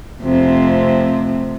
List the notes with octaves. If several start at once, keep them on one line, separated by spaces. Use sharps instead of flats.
F2 C3 A3